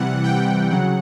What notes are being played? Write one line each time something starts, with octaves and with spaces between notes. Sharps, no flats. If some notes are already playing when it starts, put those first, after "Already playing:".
Already playing: C3 E3 G3 F#5
G5
C#3 F#3 F#5